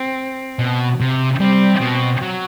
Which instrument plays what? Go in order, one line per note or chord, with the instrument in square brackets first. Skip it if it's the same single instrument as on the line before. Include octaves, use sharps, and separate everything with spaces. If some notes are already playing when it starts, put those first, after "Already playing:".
Already playing: [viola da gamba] C4
[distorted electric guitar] B2
C3
[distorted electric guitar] G3 [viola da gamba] C4
[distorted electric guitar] B2
F#3